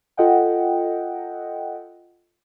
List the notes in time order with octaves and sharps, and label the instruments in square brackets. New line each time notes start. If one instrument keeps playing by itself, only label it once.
[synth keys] F4 A4 D#5 F#5 G5